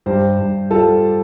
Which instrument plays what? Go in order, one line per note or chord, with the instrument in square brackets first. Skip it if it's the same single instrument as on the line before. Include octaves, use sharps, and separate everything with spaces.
[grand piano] G2 G4 C5
G2
G3 F4 A4